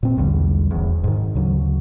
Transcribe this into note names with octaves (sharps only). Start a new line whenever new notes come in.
A#2 C4
B1 E2 D3 G3
D1 E2
G#2 D#3
D2 C#3 F#3